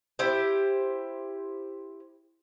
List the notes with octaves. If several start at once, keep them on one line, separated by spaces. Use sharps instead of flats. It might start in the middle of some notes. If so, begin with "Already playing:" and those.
E4 G4 C5